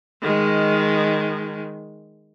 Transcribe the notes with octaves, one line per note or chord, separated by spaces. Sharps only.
D#3 G#3